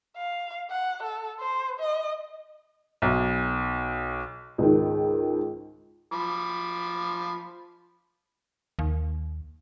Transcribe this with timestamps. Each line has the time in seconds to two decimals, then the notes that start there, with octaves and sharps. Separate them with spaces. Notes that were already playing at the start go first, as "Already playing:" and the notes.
0.17 F5
0.71 F#5
1.03 A4
1.40 C5
1.80 D#5
3.02 B1
4.58 C#2 G#2 D#3
6.12 F3 B5 D6
8.79 D#2